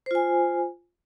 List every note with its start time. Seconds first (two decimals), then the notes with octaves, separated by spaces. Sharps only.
0.06 C5
0.11 F4
0.15 G#5